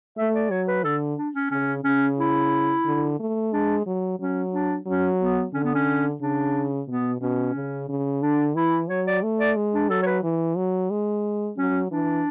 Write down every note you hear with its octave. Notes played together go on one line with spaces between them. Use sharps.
A3 E5
D5
F#3 C#5
B4
D3 A4
D4
C#4
C#3 C#4
C#3 C#4
E4
D3
A3
G#3 D4
F#3
F#3 C#4
D4
F#3 C#4
B3
D3 C#4
B3
C#4
C#3 D4
B2 B3
B2 C#4
C#3
C#3
D3 D4
E3 E4
F#3 C#5
D5
A3
D5
G#3
D4
F#3 A4
C#5
B4
E3
F#3
G#3
F#3 C#4
E3 D4